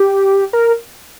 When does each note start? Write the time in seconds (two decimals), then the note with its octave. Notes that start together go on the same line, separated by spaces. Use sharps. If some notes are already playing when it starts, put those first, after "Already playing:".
Already playing: G4
0.53 A#4